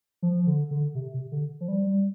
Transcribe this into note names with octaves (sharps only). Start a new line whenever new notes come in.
F3
D3
D3
C3
C3
D3
F3
G3
G3